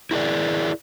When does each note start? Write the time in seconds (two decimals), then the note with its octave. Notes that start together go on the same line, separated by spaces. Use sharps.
0.11 E4 G#4 A#4 D5